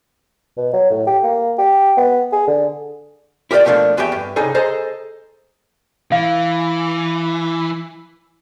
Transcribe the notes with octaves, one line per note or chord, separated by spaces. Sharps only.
B2
F#3
A2
G4
A#3
G4
B3
G#4
D3
E4 G4 A#4 B4 D5 G5
B2 F3 A3 A#3 D4
E2 B3 F#4 G4 E5 G5
G2
C2 C#3 D#4 G#4 A4 G#5
G#4 A4 C5 D#5 A#5
E3 F5